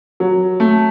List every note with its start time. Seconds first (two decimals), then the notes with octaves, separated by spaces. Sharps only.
0.20 F#3
0.60 A3